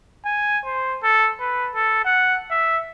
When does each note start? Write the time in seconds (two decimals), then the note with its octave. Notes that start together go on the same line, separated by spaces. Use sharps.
0.25 G#5
0.65 C5
1.03 A4
1.40 B4
1.75 A4
2.05 F#5
2.51 E5